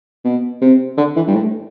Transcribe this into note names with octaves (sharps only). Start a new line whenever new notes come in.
B2
C3
D3
E3
G2
A2